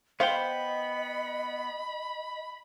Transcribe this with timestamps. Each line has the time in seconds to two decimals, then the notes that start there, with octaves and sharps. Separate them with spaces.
0.20 B3 C5 D#5 F5 G5 B5